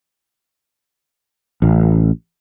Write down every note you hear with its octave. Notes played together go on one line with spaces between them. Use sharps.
A1